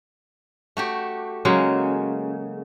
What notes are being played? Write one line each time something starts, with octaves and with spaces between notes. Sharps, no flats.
A3 F#4 G4
C#3 F#3 G#3 A#3